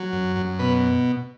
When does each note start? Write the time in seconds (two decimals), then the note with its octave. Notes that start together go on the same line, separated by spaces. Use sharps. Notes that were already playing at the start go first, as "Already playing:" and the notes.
Already playing: F#3
0.12 F#2
0.36 F#2
0.59 B2 B4